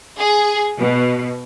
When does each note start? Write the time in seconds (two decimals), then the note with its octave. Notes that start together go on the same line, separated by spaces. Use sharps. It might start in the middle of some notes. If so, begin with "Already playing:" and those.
0.18 G#4
0.79 B2